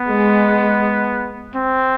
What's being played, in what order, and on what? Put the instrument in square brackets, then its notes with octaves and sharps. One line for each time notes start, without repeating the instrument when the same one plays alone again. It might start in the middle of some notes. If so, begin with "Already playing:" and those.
Already playing: [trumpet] B3
[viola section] G#3
[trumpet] C4